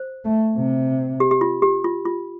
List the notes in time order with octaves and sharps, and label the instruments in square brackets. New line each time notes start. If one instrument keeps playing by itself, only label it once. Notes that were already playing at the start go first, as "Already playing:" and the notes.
Already playing: [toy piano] C5
[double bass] A3
C3
[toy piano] G4
G4
F4
G4
F4
F4